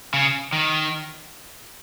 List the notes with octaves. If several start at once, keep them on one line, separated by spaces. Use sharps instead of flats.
C#3
D#3